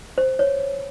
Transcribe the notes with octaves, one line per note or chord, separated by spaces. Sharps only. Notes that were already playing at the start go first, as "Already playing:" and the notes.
C5
C#5